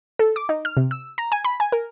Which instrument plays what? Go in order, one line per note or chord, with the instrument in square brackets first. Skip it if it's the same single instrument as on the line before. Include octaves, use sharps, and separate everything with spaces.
[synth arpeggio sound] A4
D6
D#4
F6
C3
E6
A#5
G#5
B5
G#5
A#4